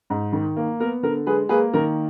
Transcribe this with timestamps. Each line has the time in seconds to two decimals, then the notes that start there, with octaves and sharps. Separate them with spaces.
0.10 G#2
0.32 D#3
0.57 A#3
0.80 B3 A#4
1.03 D3 A#4
1.27 G#3 G#4 B4
1.49 A#3 G#4 B4
1.73 D#3 A#4